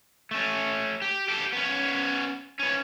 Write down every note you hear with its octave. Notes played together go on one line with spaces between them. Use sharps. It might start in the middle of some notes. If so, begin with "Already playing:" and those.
A3 C#4
G4
G4 A4
B3 C#4
B3 C#4